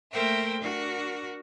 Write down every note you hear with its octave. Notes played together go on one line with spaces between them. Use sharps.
A3 A#3 A#4 C5 E5 G5
D4 F#4 A#4